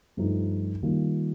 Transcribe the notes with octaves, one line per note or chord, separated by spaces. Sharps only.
G2 F3 A3 D#4
D#3 G3 A#3 F4